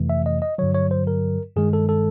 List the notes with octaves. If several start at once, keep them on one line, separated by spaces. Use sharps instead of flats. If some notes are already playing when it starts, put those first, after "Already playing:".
Already playing: F2 C3 E3 A3
E5
D#5
D#5
G2 D3 F#3 C#5
C#5
C5
A#4
G2 D#3 G#3 G#4
A4
A4